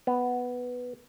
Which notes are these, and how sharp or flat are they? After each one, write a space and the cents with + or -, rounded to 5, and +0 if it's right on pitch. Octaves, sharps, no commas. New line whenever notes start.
B3 +0